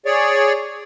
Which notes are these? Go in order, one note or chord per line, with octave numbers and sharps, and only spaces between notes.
G#4 C#5 D5